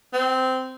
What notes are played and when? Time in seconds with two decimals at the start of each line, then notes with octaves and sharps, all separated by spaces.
0.13 C4